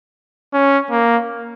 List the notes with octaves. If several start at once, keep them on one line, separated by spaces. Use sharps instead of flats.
C#4
A#3